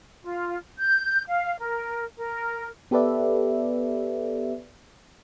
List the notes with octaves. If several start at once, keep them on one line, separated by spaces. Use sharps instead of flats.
F4
G6
F5
A#4
A#4
B3 G4 A4 B4 D5 E5